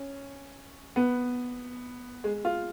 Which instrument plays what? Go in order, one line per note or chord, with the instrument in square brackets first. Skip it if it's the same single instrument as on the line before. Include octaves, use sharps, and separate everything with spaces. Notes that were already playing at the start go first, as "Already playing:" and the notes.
Already playing: [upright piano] C#4
B3
G#3
F4